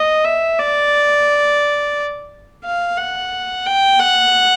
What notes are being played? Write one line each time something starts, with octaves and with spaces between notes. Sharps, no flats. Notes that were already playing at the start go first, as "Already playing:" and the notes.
Already playing: D#5
E5
D5
F5
F#5
G5
F#5